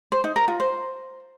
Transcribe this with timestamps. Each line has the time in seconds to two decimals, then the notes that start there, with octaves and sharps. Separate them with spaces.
0.12 C5
0.24 D#4
0.36 A#4
0.48 F4
0.60 C5